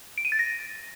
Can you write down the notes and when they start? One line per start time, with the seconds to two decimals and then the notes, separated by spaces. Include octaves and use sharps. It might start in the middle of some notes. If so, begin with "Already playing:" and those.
0.18 D7
0.25 D#7
0.32 A6
0.39 A#6